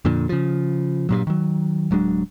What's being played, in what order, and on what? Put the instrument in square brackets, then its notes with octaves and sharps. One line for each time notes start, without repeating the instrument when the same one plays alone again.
[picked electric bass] F2 A#2 D3
C#3 F3
G2 A#2 F#3
D#3 F#3
D1 F#3 G#3 D4